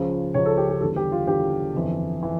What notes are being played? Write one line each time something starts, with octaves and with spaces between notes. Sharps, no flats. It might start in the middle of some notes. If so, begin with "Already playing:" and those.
Already playing: C#2 C#3 F3
C#2 C#3 F3 C#5
A4
G4
G4
E2 D3 G3 A4
G4
F4
E2 D3 G3 G4
G1 F2 E3
E3